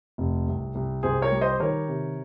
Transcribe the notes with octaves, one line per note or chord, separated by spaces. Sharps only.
F1
C2
C2
C2 G#4 C5
A#4 C#5
G3
C5 D#5
D#3 A#4 C#5
C3